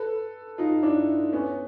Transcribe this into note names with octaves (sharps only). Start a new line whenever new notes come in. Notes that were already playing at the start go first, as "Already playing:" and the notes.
Already playing: A4 B4
D#4 F4
D4 E4
B3 C#4